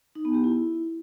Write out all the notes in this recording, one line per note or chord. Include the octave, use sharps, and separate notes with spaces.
D#4
B3
G4
E4